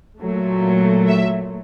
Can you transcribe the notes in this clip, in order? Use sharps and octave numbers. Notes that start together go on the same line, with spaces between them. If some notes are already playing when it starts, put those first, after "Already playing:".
A#2 F#3 A3
E5